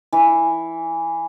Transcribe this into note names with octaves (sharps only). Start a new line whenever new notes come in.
E3